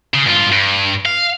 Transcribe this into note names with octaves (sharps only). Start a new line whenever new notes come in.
C#3
G2 F4
G2
F5